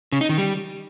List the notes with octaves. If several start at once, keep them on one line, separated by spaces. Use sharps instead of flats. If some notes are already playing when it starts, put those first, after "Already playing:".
C#3
D#4
D#3
G3